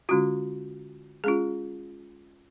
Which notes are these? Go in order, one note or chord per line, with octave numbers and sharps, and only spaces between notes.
D3 G#3 C#4 F4 F#4
G#3 C#4 F4 G#4